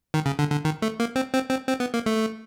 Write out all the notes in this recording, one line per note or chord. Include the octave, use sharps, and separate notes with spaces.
D#3
C#3
D3
D3
D#3
A3
A#3
C4
C4
C4
C4
B3
A#3
A3